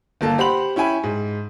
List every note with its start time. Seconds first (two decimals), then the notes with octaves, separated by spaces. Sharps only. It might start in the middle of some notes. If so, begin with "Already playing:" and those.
0.21 G1 A#3 A4
0.38 G4 C5 F#5 B5 F#7
0.76 C#4 E4 G5 G#5 B5
1.03 G#2